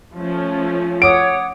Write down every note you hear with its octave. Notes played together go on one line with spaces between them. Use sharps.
F3 A3 C#4
C#5 F#5 D6 D#6 D7